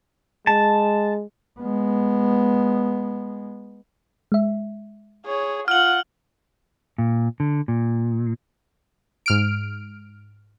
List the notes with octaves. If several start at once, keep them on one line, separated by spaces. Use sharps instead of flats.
G#3 A5
G#3 B3
G#3 E5
G#4 C#5
F4 F#5 F6 F#7
A#2
D3
A#2
G#2 F6 D7